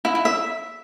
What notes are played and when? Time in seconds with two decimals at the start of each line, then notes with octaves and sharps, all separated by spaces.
0.05 E4
0.15 E4
0.25 E5